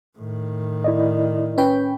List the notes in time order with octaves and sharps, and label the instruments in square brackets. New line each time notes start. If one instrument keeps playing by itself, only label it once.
[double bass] A2 D#3
[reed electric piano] E4 D5 D#5
[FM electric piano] C#4 B4 G5